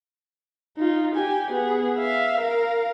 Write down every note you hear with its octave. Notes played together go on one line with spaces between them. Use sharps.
D#4 F4
G4 G#5
B3 G#4
E5 F5
A#4 F5